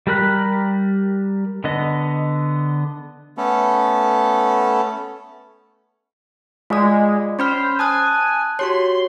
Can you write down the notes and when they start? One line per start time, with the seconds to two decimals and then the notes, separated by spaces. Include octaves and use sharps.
0.07 G3 G4 A#4 B5 F#6
1.64 D3 B3 D#5
3.38 A3 B3 C#4 A4
6.70 G#3 F4 D5
7.39 C#4 C5 B5 F6
7.79 G#5 A5 D#6 F#6
8.59 F#4 G4 C#5 C6